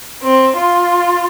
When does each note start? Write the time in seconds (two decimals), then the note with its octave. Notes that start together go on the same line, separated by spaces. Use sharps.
0.23 C4
0.57 F4